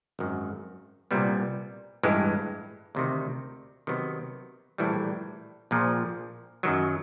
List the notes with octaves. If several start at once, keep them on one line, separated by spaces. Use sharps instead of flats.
G#1 F#2 D#3
C2 A#2 G3 B3
A1 G2 E3 G#3
D2 C3 D#3
C3 D#3 F#3 B3
A#1 A2 E3 G3
A#1 A#2 F3
F#2 D#3 F#3